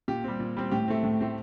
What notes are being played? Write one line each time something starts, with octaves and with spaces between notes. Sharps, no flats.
A#2 G4
G3 C4
A#2
G3 C4
A2 G4
A3 C4
A2
A3 C4